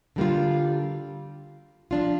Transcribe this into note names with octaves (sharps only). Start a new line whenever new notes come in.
D3 G3 A#3 F4
F3 D4 F4